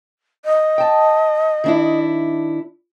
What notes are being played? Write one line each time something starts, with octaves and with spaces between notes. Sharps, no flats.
D#5
G5 A5
D#3 D4 E4